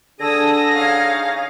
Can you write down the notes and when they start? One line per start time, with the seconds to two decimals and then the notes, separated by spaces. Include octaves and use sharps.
0.20 D3 D4 G#4 A5 D#6 E6 A#6
0.74 C#4 D#4 F5